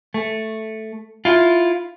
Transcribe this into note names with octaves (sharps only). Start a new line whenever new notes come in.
A3
E4 F4